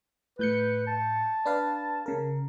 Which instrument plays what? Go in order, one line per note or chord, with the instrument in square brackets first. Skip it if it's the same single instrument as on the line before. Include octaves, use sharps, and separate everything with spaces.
[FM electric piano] A2 G6 C#7 [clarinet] B4
[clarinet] A5
[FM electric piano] D4 B4 F5
C#3 A#4